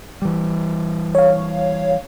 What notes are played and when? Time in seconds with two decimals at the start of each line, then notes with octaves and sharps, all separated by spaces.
0.22 E3 G3
1.15 C#5 F5